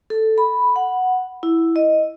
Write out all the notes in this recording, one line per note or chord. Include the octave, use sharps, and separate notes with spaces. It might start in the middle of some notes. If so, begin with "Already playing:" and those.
A4
B5
F#5
E4
D#5